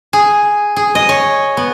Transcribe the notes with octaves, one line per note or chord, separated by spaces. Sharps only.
G#4
G#4
D#5
C#5
B3